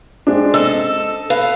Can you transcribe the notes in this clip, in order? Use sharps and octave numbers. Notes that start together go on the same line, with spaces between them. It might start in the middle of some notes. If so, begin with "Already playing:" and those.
G#3 C4 D4
A4 D#5 E6
B4 F5